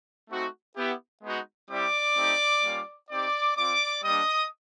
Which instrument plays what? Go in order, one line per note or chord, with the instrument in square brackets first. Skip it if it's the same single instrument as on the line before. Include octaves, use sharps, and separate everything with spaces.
[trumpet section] A3 C4 D#4 F#4
B3 E4 G4
G#3 B3 D#4 F#4
G3 C4 E4 G4 D5 D6
A3 C4 D#4 G4
G3 A#3 C#4 F4
C4 D#4 G4 D5 D6
C4 F4 D5 D6
G3 A#3 D4 D#5 D#6